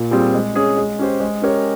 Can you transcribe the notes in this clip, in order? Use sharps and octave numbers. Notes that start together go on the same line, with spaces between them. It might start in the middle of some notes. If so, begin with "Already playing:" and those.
Already playing: A#2
G3 C4 F4 G#4
G#3
C#4 G#4 C#5
G#3
C#4 G4 C5
G#3
C#4 G4 A#4 C#5